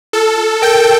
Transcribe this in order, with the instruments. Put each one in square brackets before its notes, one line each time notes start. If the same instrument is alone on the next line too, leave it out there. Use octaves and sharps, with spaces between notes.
[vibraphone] F4 [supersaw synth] A4
[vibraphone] F4
[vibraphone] A#4 [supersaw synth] G5